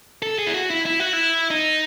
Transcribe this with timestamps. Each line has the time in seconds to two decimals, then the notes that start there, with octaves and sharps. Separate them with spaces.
0.22 A4
0.38 G#4
0.47 E4
0.54 F#4
0.70 E4
0.86 E4
1.00 F#4
1.13 E4
1.50 D#4